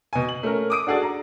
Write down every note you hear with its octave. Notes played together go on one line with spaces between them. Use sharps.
B2 G#5
F#7
A3 C#4 A#4
D6 D#6 D7
D4 F#4 G#4 A4 D5
A#5